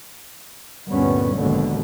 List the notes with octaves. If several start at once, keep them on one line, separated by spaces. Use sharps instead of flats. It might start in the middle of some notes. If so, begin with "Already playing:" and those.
D2 G2 A#2 G3 B3 C#4
A#1 D#2 G#2 B2 D3